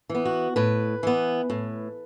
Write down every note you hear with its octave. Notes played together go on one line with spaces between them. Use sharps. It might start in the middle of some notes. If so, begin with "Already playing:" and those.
E3
B3
F#4
A2 B4
E3 B3
A2